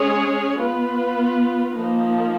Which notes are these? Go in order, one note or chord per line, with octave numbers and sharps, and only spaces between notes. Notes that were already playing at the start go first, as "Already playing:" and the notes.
Already playing: G#3 C#4 G#4 C#5
B3 F4 B4
F3 A#3 D#4